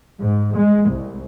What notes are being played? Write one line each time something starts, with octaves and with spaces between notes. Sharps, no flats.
G#2
G#3
C2